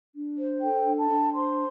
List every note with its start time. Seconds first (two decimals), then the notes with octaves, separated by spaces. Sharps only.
0.14 D4
0.37 C5
0.61 A4 G5
0.86 D4
0.98 A5
1.10 D4
1.33 C5 C6